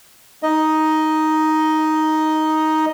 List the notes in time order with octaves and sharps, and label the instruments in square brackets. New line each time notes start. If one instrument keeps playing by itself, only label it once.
[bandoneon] D#4 D#5